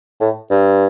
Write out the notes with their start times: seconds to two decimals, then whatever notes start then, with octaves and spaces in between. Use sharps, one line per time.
0.21 A2
0.51 G2